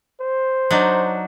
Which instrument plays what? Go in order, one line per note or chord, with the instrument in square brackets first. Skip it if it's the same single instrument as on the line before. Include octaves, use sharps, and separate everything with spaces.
[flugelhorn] C5
[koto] F#3 D4 D#4